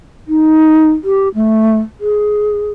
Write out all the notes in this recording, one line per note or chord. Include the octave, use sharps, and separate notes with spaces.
D#4
G4
A3
G#4